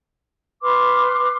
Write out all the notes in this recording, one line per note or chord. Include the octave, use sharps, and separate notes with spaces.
B4 C6 D6 F6